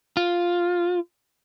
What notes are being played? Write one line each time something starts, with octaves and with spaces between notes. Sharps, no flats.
F4